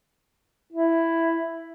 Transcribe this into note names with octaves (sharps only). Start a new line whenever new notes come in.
E4